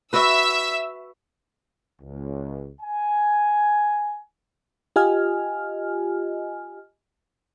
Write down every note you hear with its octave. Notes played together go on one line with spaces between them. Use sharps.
F#4 B4 E5 E6
C#2
G#5
F4 G4 D#5 G#5 F6